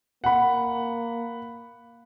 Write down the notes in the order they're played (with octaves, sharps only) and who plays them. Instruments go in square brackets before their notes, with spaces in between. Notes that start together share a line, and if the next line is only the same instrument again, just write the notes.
[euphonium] A#3 [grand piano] F#5 B5